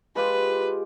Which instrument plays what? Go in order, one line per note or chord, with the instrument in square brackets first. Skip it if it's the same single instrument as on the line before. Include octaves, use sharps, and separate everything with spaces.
[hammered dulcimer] G#3 F4 G4 [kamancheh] B4